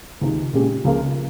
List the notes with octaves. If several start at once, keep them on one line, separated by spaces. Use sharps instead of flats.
C#2 C3 D#3
A#2 G#3 C#4 G4
C#2 C#3 F3 A#3 F4